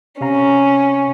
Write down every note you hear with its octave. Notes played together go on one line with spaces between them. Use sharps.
C3 C#4 F5 A#5